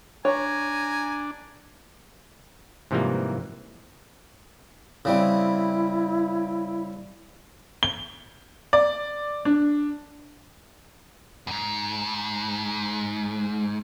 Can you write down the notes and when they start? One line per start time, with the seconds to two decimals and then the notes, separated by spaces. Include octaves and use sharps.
0.25 D4 C#5 G#5 A#5
2.91 G#2 C3 E3 F3 G3 A#3
5.05 C#3 G3 C4 E4
7.83 G7
8.73 D5
9.45 D4
11.47 E2 G#2